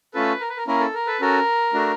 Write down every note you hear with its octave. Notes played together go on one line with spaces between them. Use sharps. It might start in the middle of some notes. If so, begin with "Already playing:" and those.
A3 C#4 F4 A4 B4
A#4
B4
A#4
A#3 C#4 E4 A#4
A4
A#4
A4 B4
C#4 F#4 A4 A#4
A3 D4 F#4